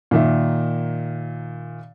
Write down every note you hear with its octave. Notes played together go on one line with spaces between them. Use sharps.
A#2 D#3 E5